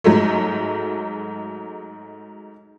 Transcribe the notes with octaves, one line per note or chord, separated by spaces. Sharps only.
G#2 F#3 G#3 A3